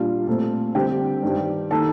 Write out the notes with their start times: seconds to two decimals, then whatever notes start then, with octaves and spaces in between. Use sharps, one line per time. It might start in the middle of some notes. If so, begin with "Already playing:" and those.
Already playing: A#2 G3 D4 F4
0.27 A#2 A3 C4
0.75 D3 G3 C4 G4 G5
1.22 G2 D#3 G3 D4
1.71 D#3 A#3 A4 A5